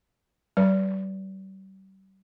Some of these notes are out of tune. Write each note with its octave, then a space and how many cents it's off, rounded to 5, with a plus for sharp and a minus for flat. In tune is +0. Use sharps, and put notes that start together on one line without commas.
G3 -35 B4 +0 D5 -30